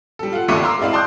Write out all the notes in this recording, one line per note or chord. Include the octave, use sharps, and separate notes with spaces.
G3 A4
F4 A4 F#5
G#1 D#2 A3 C#6 D6 D#7
F5 A#5 C6 D6 E6
G#3 C4 E4 D5 F5
A5 C6 D6 D#6 F#6 G6